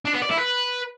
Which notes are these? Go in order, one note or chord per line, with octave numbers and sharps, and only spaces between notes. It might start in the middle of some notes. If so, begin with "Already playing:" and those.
D4
B3
D5
E4
B4